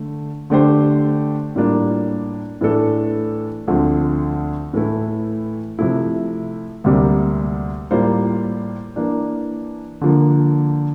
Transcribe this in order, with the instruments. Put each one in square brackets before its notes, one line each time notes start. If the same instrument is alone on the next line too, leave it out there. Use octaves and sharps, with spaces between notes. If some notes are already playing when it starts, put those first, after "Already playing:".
Already playing: [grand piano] D3 A3
D3 A3 D4 G4 C5
A2 G3 A#3 D4 F4
A2 E3 A3 D4 A4
D2 D3 F3 A3 C4
A2 E3 A3 E4
C3 F3 A3 E4
D2 C3 G3 A#3
A2 G3 A#3 F4 C5
E3 A#3 D4
D3 F3 A#3